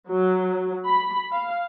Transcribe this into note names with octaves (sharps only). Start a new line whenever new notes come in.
F#3
B5
F5